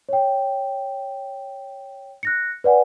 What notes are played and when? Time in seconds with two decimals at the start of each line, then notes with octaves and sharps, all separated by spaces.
0.09 C#5 G5
2.23 F#6 A#6 C#7
2.64 B4 D5 F#5 G#5